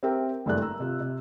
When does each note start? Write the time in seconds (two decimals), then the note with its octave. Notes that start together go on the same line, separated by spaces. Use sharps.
0.03 C4 G4 A#4 E5 G5
0.46 F#1 G2 A3 D5 F#6
0.62 A#5 E6
0.80 C3 F4
1.00 C3